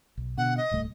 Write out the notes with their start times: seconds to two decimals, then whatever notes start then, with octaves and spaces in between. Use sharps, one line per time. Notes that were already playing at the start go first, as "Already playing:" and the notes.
0.18 B1
0.38 B2 D3 F#5
0.57 D#5
0.71 D1 C2 A3